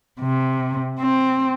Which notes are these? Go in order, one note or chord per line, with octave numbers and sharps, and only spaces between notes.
C3
C4